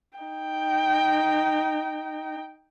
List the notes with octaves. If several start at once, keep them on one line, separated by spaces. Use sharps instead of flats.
D#4 G5